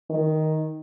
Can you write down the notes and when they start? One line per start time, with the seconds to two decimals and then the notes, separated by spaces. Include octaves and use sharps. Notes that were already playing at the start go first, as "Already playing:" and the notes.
0.10 D#3